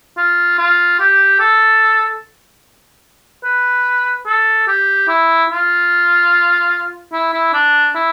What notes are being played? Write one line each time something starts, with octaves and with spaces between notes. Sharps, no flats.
F4
F4
G4
A4
B4
A4
G4
E4
F4
E4
E4
D4
E4